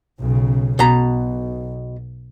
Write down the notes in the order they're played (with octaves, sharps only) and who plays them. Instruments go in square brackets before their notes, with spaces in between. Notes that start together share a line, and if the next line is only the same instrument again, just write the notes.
[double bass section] B1 C#3
[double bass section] B1 [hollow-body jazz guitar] B2 A#5